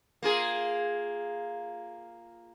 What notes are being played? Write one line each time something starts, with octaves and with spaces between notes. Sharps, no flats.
A#3 F4 G#4